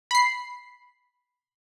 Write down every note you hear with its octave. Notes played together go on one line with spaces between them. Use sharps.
B5 C7